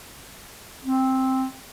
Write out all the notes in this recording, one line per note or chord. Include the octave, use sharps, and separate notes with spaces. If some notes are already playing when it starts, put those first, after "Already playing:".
C4